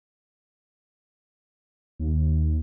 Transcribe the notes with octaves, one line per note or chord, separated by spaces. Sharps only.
D#2